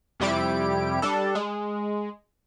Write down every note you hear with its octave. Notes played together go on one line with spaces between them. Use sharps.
F2 C3 G3 E4 G4 D7
G3 D4 A4
G#3